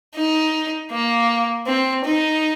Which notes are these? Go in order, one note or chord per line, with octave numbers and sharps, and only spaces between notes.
D#4
A#3
C4
D#4